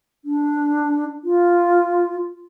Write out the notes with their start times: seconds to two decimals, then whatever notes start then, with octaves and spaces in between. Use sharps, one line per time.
0.25 D4
1.24 F4